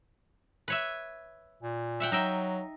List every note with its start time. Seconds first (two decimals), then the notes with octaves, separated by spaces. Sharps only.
0.68 B4 C#5 E5
1.63 A#2
2.00 E5 F#5 G5
2.12 F#3 D#4 E5 G5